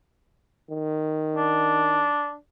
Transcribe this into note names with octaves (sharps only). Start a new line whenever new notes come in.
D#3
D4